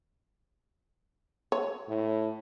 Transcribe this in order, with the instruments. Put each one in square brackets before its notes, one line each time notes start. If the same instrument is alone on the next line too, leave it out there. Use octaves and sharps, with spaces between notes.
[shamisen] C#5
[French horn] A2